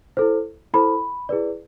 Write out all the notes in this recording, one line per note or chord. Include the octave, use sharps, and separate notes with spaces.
E4 A4 C5
E4 A4 C5 B5
E4 G#4 B4 D5